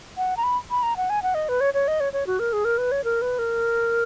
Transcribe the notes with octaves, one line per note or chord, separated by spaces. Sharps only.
F#5
A#5
B5
B5
A#5
F#5
G#5
F#5
D#5
B4
C#5
C#5
D#5
C#5
C#5
F#4
A#4
G#4
A#4
B4
C#5
A#4
B4
A#4